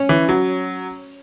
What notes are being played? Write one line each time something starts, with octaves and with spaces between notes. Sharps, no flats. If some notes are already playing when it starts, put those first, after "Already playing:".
Already playing: C#4
E3
F#3